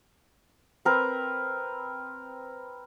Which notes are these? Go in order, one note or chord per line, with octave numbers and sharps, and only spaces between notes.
C4 A#4 B4